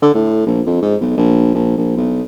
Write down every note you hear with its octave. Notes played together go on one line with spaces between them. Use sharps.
D3
A2
A#1
F2
G#2
B1
A#1
A#1
A#1
B1